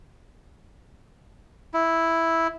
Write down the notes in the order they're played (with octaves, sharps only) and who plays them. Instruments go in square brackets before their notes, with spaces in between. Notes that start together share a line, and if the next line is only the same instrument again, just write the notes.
[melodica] E4